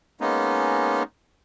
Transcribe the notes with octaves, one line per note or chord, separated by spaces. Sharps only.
G#3 A#3 B3 C#4 D#4